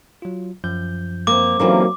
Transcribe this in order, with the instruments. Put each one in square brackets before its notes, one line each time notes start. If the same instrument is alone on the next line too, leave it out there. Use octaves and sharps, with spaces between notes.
[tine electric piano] F#3 F4
F#2 F3 G6
[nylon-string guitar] A#3 C4 [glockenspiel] D6
[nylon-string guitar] D3 E3 C4 [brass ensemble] F#3 A#3 [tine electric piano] C#4 D#4 G4